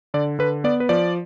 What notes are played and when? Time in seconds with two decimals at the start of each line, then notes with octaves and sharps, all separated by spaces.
0.14 D3 D5
0.39 D3 B4
0.64 B3 D5
0.80 B4
0.89 F3 D5